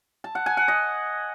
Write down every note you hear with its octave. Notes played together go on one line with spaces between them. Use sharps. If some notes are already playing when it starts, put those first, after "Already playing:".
A5
F#5
G#5
F#5
D#5